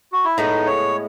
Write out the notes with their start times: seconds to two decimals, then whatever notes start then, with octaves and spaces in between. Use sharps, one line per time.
0.12 F#4
0.25 E4
0.37 A2 G#3 B3 D#4
0.66 C#5